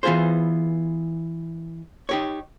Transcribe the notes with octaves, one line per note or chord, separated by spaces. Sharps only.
E3 B3 F4 G#4 C5
D#4 G4 C#5